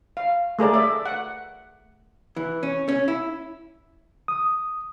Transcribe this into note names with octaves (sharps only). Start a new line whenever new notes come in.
F5
A3 G#4 A#4 D5
D5 E5
F#5
E3
C#4
C#4
E4
D#6